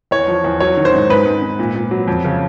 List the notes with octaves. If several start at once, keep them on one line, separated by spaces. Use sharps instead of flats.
E2 C#5
F3
E2
F#3 C#5
D#3
C5
G#2
G#2 B4
G#2
G#2
A#2
A#2
F#3
F2
C#3